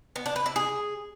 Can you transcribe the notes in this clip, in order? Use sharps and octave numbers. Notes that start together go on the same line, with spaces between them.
B3
D4
B4
E4
G#4